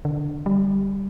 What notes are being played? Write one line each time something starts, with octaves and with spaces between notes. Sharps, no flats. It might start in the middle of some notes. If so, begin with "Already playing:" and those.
D3
G3